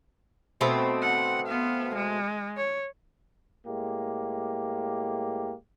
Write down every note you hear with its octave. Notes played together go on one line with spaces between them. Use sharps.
B2 A3 C4
F#5
B3 F5
G#3
C#5
A2 G#3 A#3 G4